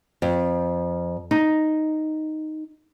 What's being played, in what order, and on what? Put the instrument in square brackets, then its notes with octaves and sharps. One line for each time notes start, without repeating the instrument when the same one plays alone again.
[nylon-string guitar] F2
D#4